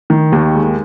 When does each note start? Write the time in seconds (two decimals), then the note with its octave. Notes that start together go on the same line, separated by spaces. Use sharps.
0.10 D#3
0.32 D#2
0.54 G#3